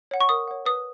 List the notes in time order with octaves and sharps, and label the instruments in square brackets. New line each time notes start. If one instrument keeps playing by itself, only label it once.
[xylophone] C#5 F#5
C#6
A#4 D#6
C#5 F#5
B4 D#6